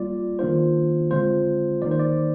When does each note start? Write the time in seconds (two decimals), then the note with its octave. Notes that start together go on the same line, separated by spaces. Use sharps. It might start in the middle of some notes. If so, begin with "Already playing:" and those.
Already playing: G3 A#3 F4 D5
0.39 D#3 A#3 D4 F4 C5
1.11 D3 G#3 C4 F4 C5
1.82 D#3 A#3 D#4 D5
1.91 C5
1.99 D5